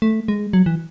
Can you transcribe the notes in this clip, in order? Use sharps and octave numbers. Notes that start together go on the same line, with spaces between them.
A3
G#3
F#3
E3